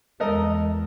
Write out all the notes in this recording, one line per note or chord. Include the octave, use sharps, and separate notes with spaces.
E2 G#3 A4 A#4 D#5